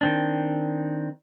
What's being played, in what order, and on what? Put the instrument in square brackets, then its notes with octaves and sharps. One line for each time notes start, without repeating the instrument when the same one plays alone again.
[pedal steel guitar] D#3 C4 D4